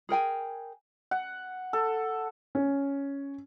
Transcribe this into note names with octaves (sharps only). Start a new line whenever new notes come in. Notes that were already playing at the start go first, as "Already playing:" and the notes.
G#4 A#4 G5 G#5
F#5
A4
C#4